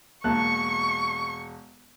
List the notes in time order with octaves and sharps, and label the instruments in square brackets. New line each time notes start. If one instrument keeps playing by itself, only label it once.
[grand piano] E1 A5 F#6 [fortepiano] A#3 [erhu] C#6